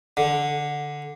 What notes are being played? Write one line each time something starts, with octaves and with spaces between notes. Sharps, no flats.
D3